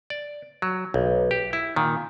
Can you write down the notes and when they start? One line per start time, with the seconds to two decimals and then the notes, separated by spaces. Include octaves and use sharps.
0.10 D5
0.62 F#3
0.94 B1
1.31 G4
1.53 E4
1.76 A#2 D#3